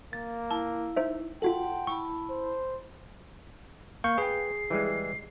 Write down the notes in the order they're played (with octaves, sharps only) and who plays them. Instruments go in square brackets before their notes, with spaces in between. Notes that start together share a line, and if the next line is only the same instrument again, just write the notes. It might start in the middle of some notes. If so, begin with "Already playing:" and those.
[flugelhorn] A#3 [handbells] A6
[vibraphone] E4 [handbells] A5
[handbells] D#4 C5 E5
[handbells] F4 F#4 A4 [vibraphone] F#5 A5 C6 [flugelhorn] G5
[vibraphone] E4 A5 B5 [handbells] C#6
[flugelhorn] C5
[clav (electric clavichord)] A#3 [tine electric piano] F5 C#6 G6
[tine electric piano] G#4 [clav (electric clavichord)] B4 G5 [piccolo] C7
[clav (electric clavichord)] E3 G3 G#3